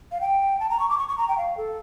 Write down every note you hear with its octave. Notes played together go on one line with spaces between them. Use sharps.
F5
G5
A5
A#5
C#6
D6
C#6
C#6
A#5
G5
F5
A4